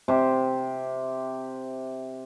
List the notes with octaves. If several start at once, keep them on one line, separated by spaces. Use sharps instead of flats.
C3 G4